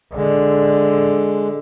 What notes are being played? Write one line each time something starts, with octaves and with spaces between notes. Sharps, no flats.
D3 G#3